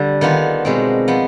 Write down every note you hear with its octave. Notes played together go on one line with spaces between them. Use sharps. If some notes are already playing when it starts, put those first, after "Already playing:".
Already playing: D3 G3
D#3 B3 D4 F4
B2 G#3 C4
F3 B3